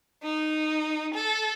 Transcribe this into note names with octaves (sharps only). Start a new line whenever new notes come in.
D#4
A4